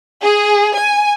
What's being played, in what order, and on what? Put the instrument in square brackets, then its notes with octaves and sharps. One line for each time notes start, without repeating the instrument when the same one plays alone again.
[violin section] G#4
G#5